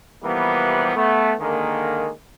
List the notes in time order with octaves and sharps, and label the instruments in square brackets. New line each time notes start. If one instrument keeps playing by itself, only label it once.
[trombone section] C3 E3 F3 G3 A#3 B3
A3 B3
D3 D#3 G#3 A#3